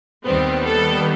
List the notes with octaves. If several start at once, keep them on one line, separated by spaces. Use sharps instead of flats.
D#2 D#3 G3 B3 C4
A4